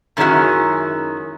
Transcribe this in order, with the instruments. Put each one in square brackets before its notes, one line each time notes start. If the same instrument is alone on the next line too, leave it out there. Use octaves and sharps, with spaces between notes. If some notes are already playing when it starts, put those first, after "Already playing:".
[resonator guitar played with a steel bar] F#2 D#3 G#3 C#4 E4 F#4